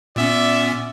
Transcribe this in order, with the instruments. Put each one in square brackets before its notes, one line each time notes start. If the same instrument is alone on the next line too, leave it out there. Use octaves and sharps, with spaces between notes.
[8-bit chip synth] A#2 B3 C#4 [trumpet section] D5 E5